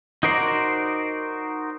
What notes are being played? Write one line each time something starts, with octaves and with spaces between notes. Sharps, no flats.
D#4 F#4 A#4 C5 D5